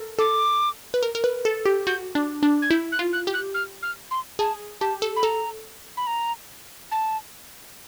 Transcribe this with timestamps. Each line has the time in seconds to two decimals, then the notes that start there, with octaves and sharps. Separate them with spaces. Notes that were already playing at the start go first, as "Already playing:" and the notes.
Already playing: A4 A#4
0.19 A4 D6
0.94 B4
1.03 A#4
1.15 A#4
1.24 B4
1.45 A4
1.66 G4
1.87 F#4 G6
2.15 D4
2.43 D4
2.62 G#6
2.70 E4 G6
2.92 F#6
2.99 F4
3.13 F#6
3.27 G4
3.34 F#6
3.54 F6
3.83 F6
4.11 C6
4.39 G#4 A5
4.81 G4 A5
5.02 A4
5.16 B5
5.23 A4 A#5
5.97 B5
6.07 A#5
6.91 A5